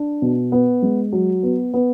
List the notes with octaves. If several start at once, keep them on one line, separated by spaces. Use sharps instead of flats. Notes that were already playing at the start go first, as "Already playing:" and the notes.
Already playing: D4
B2
B3
G#3
F#3
B3
B3